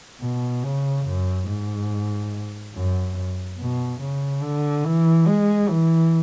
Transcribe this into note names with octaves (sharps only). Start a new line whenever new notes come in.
B2
C#3
F#2
G#2
F#2
B2
C#3
D3
E3
G#3
E3